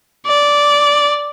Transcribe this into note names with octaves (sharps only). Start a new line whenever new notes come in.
D5